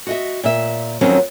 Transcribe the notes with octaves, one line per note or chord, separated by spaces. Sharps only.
F#4 D#5 E5
A#2 E5
F2 D#3 F#3 C4 C#4